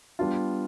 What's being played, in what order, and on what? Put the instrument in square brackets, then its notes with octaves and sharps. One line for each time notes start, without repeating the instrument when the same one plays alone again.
[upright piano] G3 B3 D4 F4